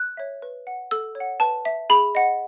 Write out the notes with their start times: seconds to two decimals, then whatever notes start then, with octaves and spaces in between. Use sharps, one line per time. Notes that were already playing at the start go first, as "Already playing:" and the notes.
Already playing: F#6
0.17 C#5 E5
0.42 B4
0.67 F#5
0.91 A4 E6
1.15 C#5
1.20 F#5
1.40 B4 A5
1.65 E5
1.90 G#4 B5
2.15 D#5 F#5